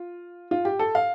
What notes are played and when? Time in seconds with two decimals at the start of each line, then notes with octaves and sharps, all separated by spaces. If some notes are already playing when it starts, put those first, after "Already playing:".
Already playing: F4
0.51 F4
0.65 G4
0.79 A4
0.95 F5